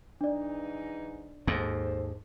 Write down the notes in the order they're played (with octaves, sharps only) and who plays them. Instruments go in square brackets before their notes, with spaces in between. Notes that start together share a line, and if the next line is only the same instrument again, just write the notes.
[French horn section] G#2 E3 D#4 [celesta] D4 D5
[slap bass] D#2 G#2 [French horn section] A4 C5